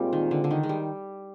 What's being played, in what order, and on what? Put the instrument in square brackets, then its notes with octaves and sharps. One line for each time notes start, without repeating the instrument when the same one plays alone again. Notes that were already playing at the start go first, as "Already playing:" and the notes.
Already playing: [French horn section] A#2 G#3 C4 F4 [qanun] G3
[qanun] D#3
D3
D3
D#3
G#3
G3